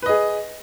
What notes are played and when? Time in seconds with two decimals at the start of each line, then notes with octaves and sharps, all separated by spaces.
0.02 B4
0.06 D#5
0.09 G#4